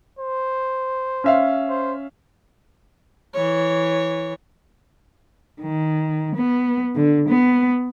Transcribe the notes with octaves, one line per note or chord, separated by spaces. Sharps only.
C5
C#4 E5 F5
C5
E3 C#5
D#3
B3
D3
B3